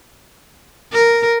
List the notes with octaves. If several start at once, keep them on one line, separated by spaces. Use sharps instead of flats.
A#4